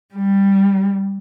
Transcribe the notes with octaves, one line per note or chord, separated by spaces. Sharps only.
G3